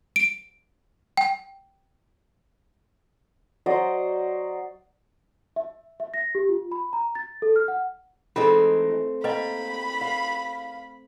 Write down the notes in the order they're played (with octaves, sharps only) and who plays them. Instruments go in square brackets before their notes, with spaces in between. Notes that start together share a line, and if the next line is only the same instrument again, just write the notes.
[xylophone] D7
G5
[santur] F#3 C5 D5 D#5
[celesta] E5
E5
A#6
G4
F4
B5
A#5
A6
A4
F6
F#5
[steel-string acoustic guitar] E3 G#3 D#4 [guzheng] A3 C4 [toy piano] F4 A4
[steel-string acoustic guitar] A#3 G5 A#5 [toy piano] B4 D#5 [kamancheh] B5
[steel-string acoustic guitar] F5